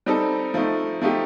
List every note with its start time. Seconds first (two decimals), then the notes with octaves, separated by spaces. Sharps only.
0.06 G3 C4 D#4 A4
0.54 F3 A3 D#4
1.02 F3 A3 D#4 G4